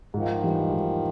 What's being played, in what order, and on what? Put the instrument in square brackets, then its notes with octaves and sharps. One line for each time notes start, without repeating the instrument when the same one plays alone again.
[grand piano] G#2 [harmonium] D#3 F3
[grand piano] E3 G3
G#2